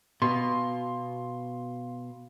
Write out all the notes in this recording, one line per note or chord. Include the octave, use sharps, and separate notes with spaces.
B2 F5 C6